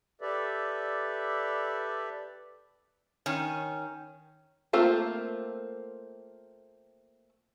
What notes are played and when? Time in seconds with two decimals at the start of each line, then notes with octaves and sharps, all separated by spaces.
0.21 G4 A4 B4 D5 E5
3.26 D#3 C#4
4.73 A3 A#3 C4 F4 A4